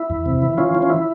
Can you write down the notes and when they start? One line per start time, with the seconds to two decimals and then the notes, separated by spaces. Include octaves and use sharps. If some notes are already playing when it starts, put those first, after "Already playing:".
Already playing: E4
0.10 E2
0.26 C3
0.42 E3
0.58 E3 C#4 F4
0.75 E3
0.82 C#4
0.90 E4